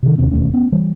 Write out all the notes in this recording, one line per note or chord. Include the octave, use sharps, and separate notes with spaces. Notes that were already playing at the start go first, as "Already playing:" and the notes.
C3 D#3
E1 D#2 C3 C#4
E1 D#2 A3 C#4
B3 C#4
E3 G3